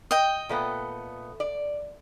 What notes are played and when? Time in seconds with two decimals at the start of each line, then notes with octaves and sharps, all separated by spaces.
0.11 D#5 G5
0.49 A#2 A3 B3
1.40 D5